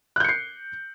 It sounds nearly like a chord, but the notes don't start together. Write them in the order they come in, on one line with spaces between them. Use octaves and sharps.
F#6 G6 C#7 C7